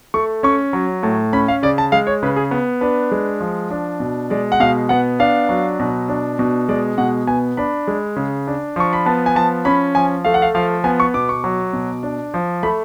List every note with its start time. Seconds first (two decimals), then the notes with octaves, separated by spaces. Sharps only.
0.14 A3 C#6
0.43 C#4 C#6
0.73 F#3
1.03 A2
1.33 C#4 B5
1.48 F5
1.63 C#3 D5
1.78 A5
1.92 G#3 F5
2.07 C#5
2.23 C#3 B4
2.36 G#4
2.51 B3
2.81 D4 B4
3.12 G#3
3.40 F3
3.71 D4
4.00 B2
4.30 G#3 D5
4.52 F#5
4.60 B2 F5
4.89 B3 F#5
5.19 D4 F5
5.49 F#3
5.80 B2
6.09 D4
6.39 B2
6.69 G#3 D5
6.98 B2 F#5
7.27 B3 G#5
7.57 D4 B5
7.87 G#3
8.16 C#3
8.47 D4
8.76 F3 C#6
8.93 B5
9.06 B3 A5
9.26 G#5
9.35 F3 A5
9.65 C#4 B5
9.95 F3 G#5
10.25 A3 F5
10.34 F#5
10.42 F5
10.55 F3 F5
10.84 B3 G#5
11.00 C#6
11.14 B2 D6
11.29 C#6
11.44 F#3
11.73 B2
12.03 D4
12.34 F3
12.63 A3 B5